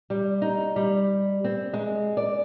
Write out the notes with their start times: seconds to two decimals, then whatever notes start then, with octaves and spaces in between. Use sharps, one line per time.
0.10 G3
0.42 D#4
0.76 G3
1.44 C4
1.73 G#3
2.17 D5